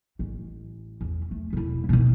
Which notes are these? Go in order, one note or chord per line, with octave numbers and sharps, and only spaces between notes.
A1
E2
A3
E1 E4
B2 D#3